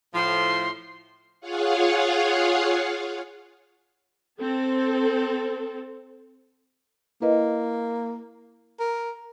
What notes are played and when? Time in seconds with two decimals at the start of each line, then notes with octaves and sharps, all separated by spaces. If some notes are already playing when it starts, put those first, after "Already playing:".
0.14 A2 F3 C6
1.41 F4 G#4 C#5 F5 F#5
4.39 C4 A4
7.22 A#3 E4 B4 D#5
8.79 A#4